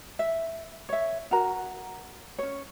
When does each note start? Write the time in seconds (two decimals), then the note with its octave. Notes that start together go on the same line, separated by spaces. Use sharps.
0.19 E5
0.89 C#5 E5
1.31 F#4 A#4 A#5
2.39 C#4 C#5